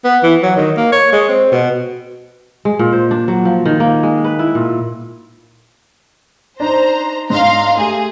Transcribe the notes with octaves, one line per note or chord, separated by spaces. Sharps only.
B3
E3
F#3
D#3
A#3
C#5
G#3
C4
B2
G#3
A#2
C5
D4
F#3
F3
D#3
A#3
G#3
B4
E4
A#2
D4 D#4 C5 A#5
G#2 D4 F5 A#5 C6
A3 G4 G#4